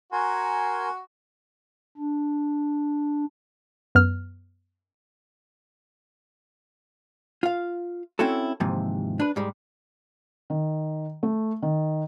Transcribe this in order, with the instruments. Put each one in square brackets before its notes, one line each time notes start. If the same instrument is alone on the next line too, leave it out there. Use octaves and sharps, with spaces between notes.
[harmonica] F#4 [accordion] A#4 G#5 C6
[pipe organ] D4
[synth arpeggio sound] F#2 B3 F6
[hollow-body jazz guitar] F4 F5
C4 C#4 E4 F#4 A4
D#2 G#2 C3 E3 F3
D4 B4
G#2 G3 G#3
[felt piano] D#3
A3
D#3